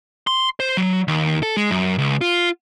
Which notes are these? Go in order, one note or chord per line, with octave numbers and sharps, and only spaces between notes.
C6
C5
F#3
D#2
A4
G#3
F#2
C#2
F4